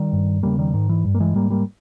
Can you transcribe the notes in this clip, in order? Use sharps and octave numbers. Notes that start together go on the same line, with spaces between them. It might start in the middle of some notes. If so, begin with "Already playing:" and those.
Already playing: D#3 G3
G2
E2 C#3 G3 A#3
D#3 G3
G#2 D#3
E3
G2
A#3
E3 G#3
G#2 G3 A#3
G3 A#3